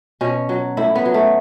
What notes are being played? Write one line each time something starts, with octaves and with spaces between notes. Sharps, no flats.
B2 C#4
F#3
A2 E4
B3
F#3
A3